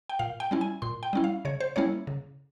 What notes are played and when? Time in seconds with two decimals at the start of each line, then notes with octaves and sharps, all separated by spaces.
0.09 G5
0.19 A#2 F5
0.40 G5
0.51 G3 C#4 E4
0.61 G#5
0.82 A#2 C6
1.03 G5
1.13 G3 C#4 E4
1.24 F5
1.45 C#3 C#5
1.60 C5
1.76 G3 A#3 C#4 E4 C#5
2.07 C#3